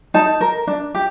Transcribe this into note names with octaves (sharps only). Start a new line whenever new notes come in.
D#4 A5
A#4
D4
G4